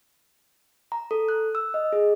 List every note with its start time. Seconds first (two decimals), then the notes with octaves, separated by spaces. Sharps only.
0.92 A#5
1.11 A4
1.29 F#6
1.55 E6
1.74 D#5
1.93 G#4